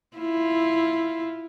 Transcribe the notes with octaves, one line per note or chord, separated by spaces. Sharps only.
E4 F4